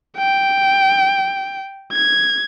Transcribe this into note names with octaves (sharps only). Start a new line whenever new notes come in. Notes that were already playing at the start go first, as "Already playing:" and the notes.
G5
G#6